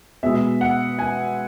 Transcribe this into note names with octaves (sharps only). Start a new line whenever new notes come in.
B2 G#3 B3 E5
F#5
G#5